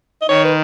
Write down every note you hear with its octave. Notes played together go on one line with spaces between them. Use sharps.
D#5
D#3 C#5
B4